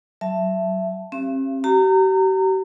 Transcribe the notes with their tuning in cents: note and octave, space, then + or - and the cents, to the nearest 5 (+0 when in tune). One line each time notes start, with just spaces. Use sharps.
F#3 +20 E5 +15 A5 +0
C4 +45 G4 +0 F5 -45
G4 -45 A#5 -25